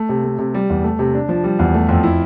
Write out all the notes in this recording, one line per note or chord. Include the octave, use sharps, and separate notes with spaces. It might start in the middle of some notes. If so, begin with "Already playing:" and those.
Already playing: A3
C3
A3
C3
G3
E2
A3
C3
D4
F3
G3
E2
A3
F2
E4